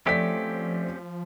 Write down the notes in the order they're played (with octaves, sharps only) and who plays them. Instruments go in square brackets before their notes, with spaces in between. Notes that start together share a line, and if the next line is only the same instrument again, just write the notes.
[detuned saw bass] F3 [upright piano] A3 D5 B6 [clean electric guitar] C4 C#4 G4